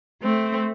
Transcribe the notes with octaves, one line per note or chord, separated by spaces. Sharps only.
A3 C4